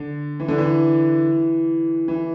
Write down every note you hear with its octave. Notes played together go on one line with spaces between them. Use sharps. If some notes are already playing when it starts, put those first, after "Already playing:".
Already playing: D3
E3
D3
E3
E3